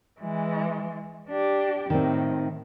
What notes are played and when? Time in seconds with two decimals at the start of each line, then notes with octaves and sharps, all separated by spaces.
0.21 E3 G#3
1.30 D4 G4
1.90 A2 D#3 C4